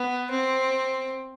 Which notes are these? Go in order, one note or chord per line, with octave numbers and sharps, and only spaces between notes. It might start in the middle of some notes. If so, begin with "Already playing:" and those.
Already playing: B3
C4